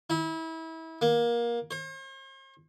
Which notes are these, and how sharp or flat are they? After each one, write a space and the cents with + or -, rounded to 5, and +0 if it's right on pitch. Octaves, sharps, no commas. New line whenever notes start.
E4 -30
A#3 +20
C5 +45